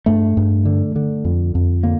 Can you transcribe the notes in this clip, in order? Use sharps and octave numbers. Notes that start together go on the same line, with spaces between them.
G2 A3
G2
D3
D3
F2
F2
D3 A#3